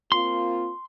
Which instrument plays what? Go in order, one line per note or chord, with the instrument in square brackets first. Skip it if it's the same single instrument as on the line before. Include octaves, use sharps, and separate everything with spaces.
[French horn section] A#3 C4 F4 [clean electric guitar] C6